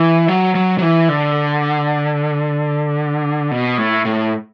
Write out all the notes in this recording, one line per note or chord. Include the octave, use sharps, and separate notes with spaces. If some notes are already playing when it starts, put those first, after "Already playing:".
Already playing: E3
F#3
F#3
F#3
E3
D3
B2
A2
A2